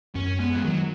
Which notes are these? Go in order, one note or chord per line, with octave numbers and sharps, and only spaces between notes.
F#2 C#4
G#3 B3
F3
D#3 F#3